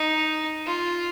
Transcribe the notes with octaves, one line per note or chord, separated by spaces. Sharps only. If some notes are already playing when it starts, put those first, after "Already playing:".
Already playing: D#4
F4